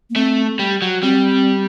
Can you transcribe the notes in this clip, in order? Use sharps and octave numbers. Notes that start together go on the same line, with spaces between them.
A#3
A3 C4
G3
F#3
G3 C4